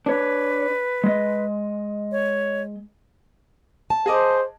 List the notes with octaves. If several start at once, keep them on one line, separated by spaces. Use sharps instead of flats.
D4 B4 C#5
G#3 D#5
C#5
A5
G#4 C5 D#5 D6